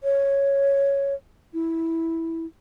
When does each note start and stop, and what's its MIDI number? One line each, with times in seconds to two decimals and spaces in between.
0.04 1.14 73
1.54 2.46 64